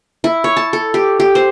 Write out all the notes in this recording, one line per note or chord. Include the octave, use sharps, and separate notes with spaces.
E4
C#5
A5
A4
G4
G4
C5